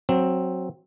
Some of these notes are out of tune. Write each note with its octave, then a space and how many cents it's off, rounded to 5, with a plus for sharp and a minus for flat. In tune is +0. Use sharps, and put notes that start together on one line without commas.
F#3 -5 C4 +10